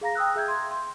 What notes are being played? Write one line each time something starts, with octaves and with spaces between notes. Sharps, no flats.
G#4 F5 A#5 A#6
G5 D#6 E6 F#6
G#4 E5 G6 G#6
C6 G#6
C6